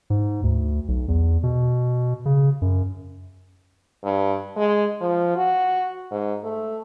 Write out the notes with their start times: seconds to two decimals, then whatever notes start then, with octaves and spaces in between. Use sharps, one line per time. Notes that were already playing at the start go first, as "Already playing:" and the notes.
0.10 G#2
0.43 D2
0.88 B1
1.08 E2
1.43 B2
2.26 C#3
2.62 F#2
4.04 G2
4.57 G#3
5.01 F3
5.36 F#4
6.11 G#2
6.44 A3